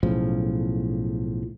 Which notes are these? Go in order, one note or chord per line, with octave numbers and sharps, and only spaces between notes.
B1 A2 C#3 F3